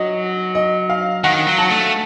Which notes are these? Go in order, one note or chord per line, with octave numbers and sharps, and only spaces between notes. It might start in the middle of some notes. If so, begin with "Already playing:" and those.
Already playing: F#3 D#5
D#5
F5
D#3 F#5
F#3
A5
A3